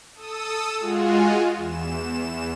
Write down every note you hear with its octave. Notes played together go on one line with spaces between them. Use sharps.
A4 D#6 E6
G#3 F4 F#4 G#4
E2 E7